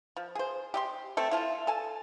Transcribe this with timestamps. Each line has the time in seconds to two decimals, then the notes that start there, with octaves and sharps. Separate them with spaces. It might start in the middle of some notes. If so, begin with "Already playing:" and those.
0.17 F3
0.35 G#4 C5
0.74 G4 D#5 C6
1.17 A3 C4 A4
1.31 E4 F4 A5
1.67 A4 G#5 A5